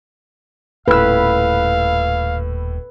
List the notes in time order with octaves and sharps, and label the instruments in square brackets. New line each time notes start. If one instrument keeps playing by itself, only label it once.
[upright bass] D#1 [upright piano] A2 E6 [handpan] B4 [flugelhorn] F5